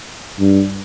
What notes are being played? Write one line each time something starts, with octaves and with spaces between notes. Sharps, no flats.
G2